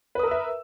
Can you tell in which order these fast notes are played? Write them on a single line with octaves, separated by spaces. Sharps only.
B4 D#6 A#4 E6 E5